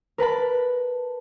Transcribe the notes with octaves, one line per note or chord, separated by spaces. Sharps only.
A#4 B4 A5 B5